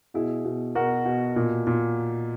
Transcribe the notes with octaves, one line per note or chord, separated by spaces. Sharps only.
B2 E4 G#4
B2
B2 F#4 A#4
B2
A#2
A#2